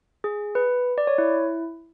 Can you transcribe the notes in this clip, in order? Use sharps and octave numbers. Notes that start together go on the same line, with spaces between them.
G#4
B4
D5
C#5
E4